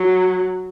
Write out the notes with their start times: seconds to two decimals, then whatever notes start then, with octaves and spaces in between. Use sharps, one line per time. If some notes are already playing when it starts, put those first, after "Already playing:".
Already playing: F#3